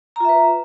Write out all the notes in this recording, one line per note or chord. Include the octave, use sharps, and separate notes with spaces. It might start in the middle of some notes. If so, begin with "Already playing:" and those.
F4 B4 E5 A#5